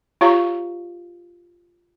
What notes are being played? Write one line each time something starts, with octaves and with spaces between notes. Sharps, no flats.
F4 G4 C#5 F5 A#5 C#6